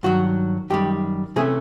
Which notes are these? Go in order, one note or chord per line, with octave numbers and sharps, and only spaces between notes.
G2 D#3 F#3 F#4
F#2 D#3 G3 G4
C3 E3 A3 C#4 G#4